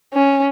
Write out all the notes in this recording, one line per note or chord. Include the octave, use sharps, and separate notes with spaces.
C#4